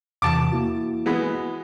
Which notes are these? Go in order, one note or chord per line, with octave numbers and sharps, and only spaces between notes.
E2 C3 E3 A5 D6
A#3 E4 F#4
E3 G#3 B3